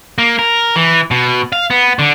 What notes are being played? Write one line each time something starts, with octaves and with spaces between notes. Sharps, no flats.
A#3
A#4
E3
B2
F5
B3
D3